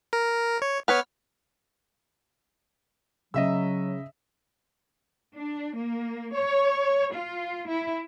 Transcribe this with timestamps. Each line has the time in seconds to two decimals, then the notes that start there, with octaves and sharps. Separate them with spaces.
0.13 A#4
0.62 C#5
0.88 B3 B4 C#5 F6
3.34 C#3 F#3 D#5 E5 E6
5.37 D4
5.77 A#3
6.34 C#5
7.14 F4
7.68 E4